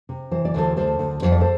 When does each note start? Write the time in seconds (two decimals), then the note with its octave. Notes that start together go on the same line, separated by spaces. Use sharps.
0.09 C3
0.31 E3 C5
0.45 D5
0.54 D2 A4 C5
0.77 D2 A4 C5
0.99 D2
1.22 F2 C5
1.32 D5
1.41 A4 C5